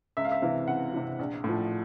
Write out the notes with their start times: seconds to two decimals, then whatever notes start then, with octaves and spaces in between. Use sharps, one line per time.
0.17 C#2 E5
0.25 F5
0.31 E5
0.42 C3 E3 F5
0.67 C#2 F#5
0.93 C3 E3
1.19 A#1
1.44 A2 F3